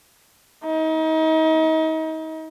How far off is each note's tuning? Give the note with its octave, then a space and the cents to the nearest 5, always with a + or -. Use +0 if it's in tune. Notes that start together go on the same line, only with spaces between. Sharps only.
D#4 +35